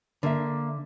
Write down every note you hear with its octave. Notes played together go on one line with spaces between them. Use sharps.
D3 A#3 E5